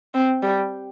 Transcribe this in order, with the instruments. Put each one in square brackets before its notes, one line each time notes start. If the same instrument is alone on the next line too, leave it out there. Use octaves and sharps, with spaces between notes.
[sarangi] C4
G3